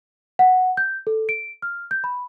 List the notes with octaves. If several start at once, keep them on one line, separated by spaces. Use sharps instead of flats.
F#5
G6
A4
D7
F6
G6
B5